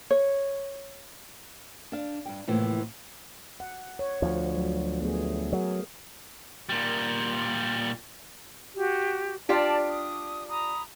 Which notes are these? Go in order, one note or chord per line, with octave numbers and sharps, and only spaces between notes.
C#5
D4 F5
G2 G5
A2 C3 E3 F3 A#3
F#5
C#5
D2 F3
F#3
A3 B3 G#4
F#3 G#4 A#4
A#2 G3
F#4 G4
D4 F4 G4 D5 A5
D#6
A#5 B5 D#6